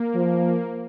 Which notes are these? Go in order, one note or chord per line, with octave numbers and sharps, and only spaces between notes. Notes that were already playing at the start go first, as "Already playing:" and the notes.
Already playing: A#3
F3